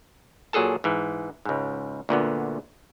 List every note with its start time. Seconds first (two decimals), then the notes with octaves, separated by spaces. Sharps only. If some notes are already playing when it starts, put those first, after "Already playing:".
0.53 A#2 F#3 G#4 A4 A5
0.84 G#2 E3
1.45 C#2 G#2
2.09 D2 A#2 D3 B3